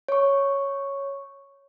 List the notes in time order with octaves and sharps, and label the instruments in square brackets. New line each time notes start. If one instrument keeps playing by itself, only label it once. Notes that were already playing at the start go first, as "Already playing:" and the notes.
[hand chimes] C#5 C#6